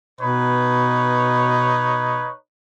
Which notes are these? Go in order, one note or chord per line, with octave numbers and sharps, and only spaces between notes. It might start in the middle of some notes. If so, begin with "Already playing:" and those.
B2 D#4 B4 C#5